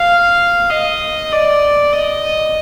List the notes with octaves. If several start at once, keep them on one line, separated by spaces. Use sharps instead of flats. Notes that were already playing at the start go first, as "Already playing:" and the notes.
Already playing: F5
D#5
D5
D#5